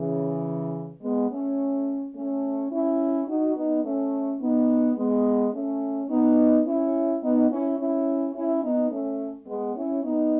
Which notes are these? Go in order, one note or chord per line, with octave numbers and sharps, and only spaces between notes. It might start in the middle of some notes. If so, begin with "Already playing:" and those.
Already playing: C#3 E3
G#3 B3
A3 C#4
A3 C#4
C#4 E4
D#4 F#4
B3 D#4
A3 C#4
B3 D#4
G#3 B3
A3 C#4
B3 D#4
C#4 E4
B3 D#4
C#4 E4
C#4 E4
C#4 E4
B3 D#4
A3 C#4
G#3 B3
C#4 E4
B3 D#4